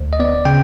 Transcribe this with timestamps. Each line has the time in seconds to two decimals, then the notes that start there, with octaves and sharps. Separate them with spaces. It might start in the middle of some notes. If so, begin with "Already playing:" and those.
Already playing: D2
0.13 D#5
0.20 B3 D5
0.45 C#3 G5